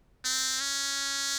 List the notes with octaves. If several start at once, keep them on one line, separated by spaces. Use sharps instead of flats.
C4
C#4